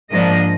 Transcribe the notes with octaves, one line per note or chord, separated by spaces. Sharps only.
G#2 F3 A#3 D4 D#5